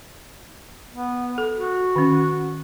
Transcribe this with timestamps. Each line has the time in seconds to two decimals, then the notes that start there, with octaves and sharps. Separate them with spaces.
0.91 B3
1.38 A4
1.55 F#4
1.96 D#3 C#4